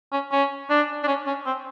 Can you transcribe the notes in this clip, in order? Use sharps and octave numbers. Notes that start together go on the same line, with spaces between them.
C#4
C#4
D4
D4
C#4
C#4
C4